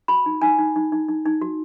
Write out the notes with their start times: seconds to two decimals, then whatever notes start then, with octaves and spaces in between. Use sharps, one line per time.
0.08 F#4 B5
0.26 D#4
0.42 D#4 G#5
0.58 D#4
0.76 D#4
0.92 D#4
1.08 D#4
1.26 D#4
1.41 F#4